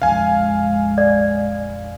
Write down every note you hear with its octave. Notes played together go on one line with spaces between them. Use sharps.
A#1 F2 F3 G#3 F5 G#5
D5